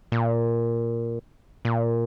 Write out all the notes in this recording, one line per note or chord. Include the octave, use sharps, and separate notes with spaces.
A#2
A#2